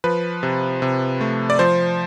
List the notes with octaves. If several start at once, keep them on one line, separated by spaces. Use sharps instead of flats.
F3 B4
C3
C3
A3
D5
F3 C5